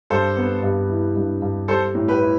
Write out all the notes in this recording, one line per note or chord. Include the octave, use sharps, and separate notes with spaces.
G2 A4 C5
B3
G2
E3
G2
G2
G3 A4 C5
A2
G4 B4
E4